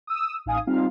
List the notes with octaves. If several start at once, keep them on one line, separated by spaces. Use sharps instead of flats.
D#6 E6
A1 D#4 F5 G#5 D#6
G3 C4 D#4 F4 F5